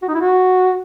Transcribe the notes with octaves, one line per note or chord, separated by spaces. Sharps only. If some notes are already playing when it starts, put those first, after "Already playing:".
F#4
D#4
E4
F#4